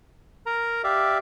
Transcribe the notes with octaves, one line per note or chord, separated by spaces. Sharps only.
A#4 A#5
G4 D5 E5 F5